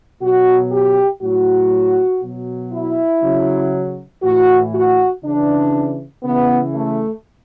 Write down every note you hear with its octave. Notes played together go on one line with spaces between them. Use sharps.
B2 F#3 F#4
G4
A2 F#3 F#4
B2 F#3
E4
C#3 F#3
A2 E3 F#4
F#4
C#3 E3 D4
C#3 E3 B3
A3